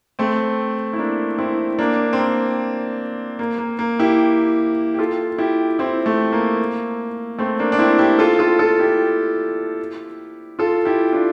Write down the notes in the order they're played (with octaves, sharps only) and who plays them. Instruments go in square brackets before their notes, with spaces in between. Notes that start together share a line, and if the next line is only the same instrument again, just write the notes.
[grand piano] A3 C4
E4
A#3 D4
C4 E4
A#3 D4
C4
A#3
A#3
A#3
A#3
E4 G4
G4
F4 A4
E4 G4
C4 E4
A3
A#3
A3 C4
A#3 D4
D4
C4 E4
E4 G4
F4 A4
F4 A4
F4 A4
E4 G4
F4 A4
E4 G4
D4 F4